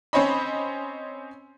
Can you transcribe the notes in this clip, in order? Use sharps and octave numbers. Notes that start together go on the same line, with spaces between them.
C4 C#4 C5 C#5 D#5 B5